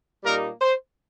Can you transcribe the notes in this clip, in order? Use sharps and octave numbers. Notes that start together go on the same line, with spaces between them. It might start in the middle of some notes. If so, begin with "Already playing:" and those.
A#2 G3 A#3 D#4 A#4
C5